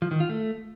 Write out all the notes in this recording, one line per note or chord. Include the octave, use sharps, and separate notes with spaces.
F3
D#3
F4
A3